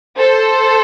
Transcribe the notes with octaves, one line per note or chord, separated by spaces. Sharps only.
A4 C5